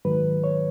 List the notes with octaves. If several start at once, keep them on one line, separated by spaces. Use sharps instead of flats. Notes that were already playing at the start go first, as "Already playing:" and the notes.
G#2 D#3 F#3 B4
C#5